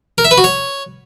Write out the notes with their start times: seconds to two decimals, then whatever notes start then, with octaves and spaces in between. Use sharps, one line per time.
0.18 A#4
0.25 E5
0.31 B4
0.38 F#4
0.44 C#5